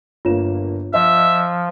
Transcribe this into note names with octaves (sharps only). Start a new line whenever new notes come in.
G1 A#3 F4 C#5 E7
F3 D#5 E5